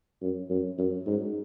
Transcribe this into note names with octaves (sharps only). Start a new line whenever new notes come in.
F#2
F#2
F#2
G#2